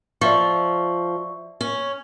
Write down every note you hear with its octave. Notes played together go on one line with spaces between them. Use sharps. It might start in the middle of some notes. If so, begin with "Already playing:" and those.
F3 D5 E5 C#6
C#4